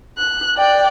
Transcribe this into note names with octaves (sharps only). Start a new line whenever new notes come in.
F#6
D5 G5